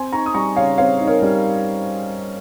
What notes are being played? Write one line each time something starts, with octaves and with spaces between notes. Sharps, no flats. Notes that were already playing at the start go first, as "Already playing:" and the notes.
Already playing: C4 G#5 C6
D#4 A#5 C#6
D#6
G3 A#5 C#6
C#3 C#5 F5
C4 C#5 F5
D#4
A#4 C#5
G3